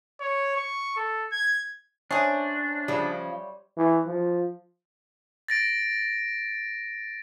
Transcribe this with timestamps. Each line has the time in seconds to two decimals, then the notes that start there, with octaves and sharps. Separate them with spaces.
0.20 C#5
0.56 C#6
0.96 A4
1.31 G#6
2.11 C#4 D4 G#4 C5 C#5 E5
2.88 C#3 F3 G3
3.77 E3
4.07 F3
5.48 A6 A#6 D7